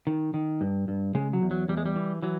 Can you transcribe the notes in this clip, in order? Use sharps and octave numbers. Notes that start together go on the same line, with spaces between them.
D#3
D#3
G2
G2
C#3 G#3
F#3
E2
F#3
E2 G3
G#3
G3
E3
E3 F#3